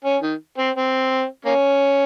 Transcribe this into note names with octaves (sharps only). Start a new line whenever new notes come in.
C#4
D#3
C4
C4
A#3 C#4